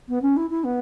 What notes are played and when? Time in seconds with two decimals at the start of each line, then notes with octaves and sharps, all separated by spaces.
0.09 B3
0.22 C#4
0.36 E4
0.50 E4
0.64 B3